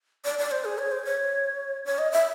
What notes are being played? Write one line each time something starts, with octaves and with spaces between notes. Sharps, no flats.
D5
D5
C5
G#4
C#5
C5
C#5
C#5
D#5
E5